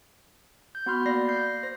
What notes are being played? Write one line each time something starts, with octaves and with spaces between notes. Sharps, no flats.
G6
B3 F#4 B5 C6 F6
A#3 D5 B5 A#6 C7
G6 C7
C5 A#6